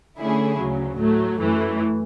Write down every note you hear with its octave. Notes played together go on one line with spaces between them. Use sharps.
D3 A3 C#4 E4 G#4
D2 C#3 F#3
A2 F#3 A3
F#2 E3 A3